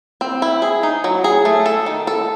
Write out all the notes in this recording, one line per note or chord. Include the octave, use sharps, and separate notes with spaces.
C4
E4
G#4
D#4
F#3
G#4
A3
A4
D#3
A4